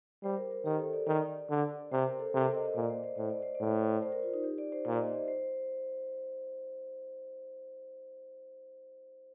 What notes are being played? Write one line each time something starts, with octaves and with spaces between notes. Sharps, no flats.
G3 C5
A#4
A#4
D#3 G4
A4
D5
D#3 D5
D3
C3 C5
A#4
A4
C3 A#4
C5
D#5
D#5
A#2 D5
C5
C5
A2 C5
D5
C5
D5
A2
C5
C5
A#4
F4
D#4
G4
D5
C5
A#2 D5
D#5
C5
C5